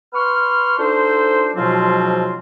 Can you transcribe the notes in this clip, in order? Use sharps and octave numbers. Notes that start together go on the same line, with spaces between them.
B4 C6 C#6 F6
D4 D#4 F4 A4 C5
G#2 B2 F3 F#3 C4 F4